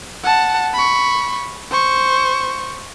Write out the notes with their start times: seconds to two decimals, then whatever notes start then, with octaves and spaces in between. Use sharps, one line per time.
0.23 F#5 A5
0.74 B5 C#6
1.71 C5 C#6